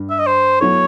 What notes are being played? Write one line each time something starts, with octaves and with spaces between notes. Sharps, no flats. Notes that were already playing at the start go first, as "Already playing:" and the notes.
Already playing: G2
E5
D#5
C5
F#3 B3 E4 A4 C#5